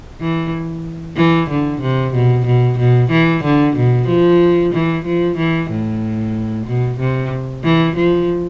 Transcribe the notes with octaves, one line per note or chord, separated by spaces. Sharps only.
E3
E3
D3
C3
B2
B2
B2
E3
D3
B2
F3
E3
F3
E3
A2
B2
C3
E3
F3